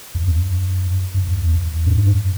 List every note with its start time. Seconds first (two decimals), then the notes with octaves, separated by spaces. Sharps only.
0.15 E2
0.24 F#2
1.14 F#2
1.28 E2
1.55 E2
1.86 A2
1.96 G#2
2.06 F#2